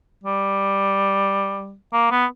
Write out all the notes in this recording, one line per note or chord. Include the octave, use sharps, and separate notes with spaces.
G3
A#3
B3